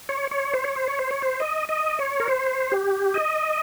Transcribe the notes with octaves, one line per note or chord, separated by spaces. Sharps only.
C#5
C#5
C5
C#5
C5
C#5
C5
C#5
C5
D#5
D#5
C#5
A#4
C5
G4
D#5